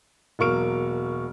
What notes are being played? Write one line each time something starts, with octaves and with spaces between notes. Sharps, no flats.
E1 F#3 A#3 C#6 F6 D7